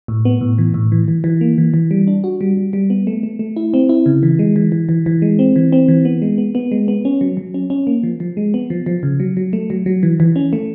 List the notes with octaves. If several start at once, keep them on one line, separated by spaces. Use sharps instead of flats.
A2
B3
A2
E3
A2
E3
E3
E3
A#3
E3
E3
G3
D4
F#4
G3
G3
G3
B3
A3
A3
A3
E4
C4
E4
C#3
E3
G#3
E3
E3
E3
E3
G#3
C4
E3
C4
E3
B3
G#3
B3
B3
G#3
B3
C#4
F#3
F#3
C#4
C#4
A#3
F3
F3
G#3
B3
F3
F3
C#3
F#3
F#3
A3
F#3
F#3
E3
E3
C#4
A3